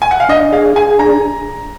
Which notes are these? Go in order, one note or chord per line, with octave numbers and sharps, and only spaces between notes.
G#5
F#5
F5
D4 D#5
G#4 F5
G#4 G#5
D4 A#5